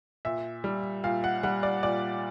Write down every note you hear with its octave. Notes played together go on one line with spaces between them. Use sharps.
A#2 E5
G3
A#2 F5
F#5
G3 F#5
D5
A#2 D5